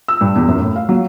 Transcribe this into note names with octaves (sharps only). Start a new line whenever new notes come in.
E6
G2
E2
F#2
A2
F5
F#3